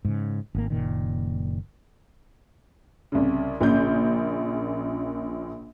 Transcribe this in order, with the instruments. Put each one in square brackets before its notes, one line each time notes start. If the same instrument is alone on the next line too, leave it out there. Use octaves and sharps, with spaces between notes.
[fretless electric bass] G#2 C#3
G#1 A#3
F#1 A#2 D#3
[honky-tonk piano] C2 C#3
A#1 A#2 C#3 G6